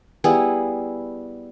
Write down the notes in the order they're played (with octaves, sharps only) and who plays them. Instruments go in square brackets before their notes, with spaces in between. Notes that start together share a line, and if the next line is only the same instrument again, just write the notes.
[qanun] G3 B3 E4 G#4